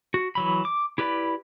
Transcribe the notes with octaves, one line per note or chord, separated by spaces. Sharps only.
F#4
E3 F#3 B5
D6
E4 G4 B4 D5 B5